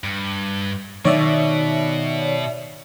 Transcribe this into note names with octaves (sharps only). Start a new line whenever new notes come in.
G2
B2 D#3 C#5 D5 E5